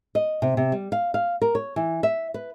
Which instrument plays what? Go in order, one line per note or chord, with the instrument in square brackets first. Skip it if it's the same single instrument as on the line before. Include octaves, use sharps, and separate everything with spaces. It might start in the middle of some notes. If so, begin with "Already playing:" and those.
[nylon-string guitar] D#5
C3
C3
G3
F5
F5
A#4
C#5
E3
E5
B4